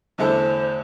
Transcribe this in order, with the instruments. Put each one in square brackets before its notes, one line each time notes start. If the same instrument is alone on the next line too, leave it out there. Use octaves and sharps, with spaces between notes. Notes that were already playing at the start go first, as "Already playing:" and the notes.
[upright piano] E2 D3 A3 E4 A4 [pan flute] C5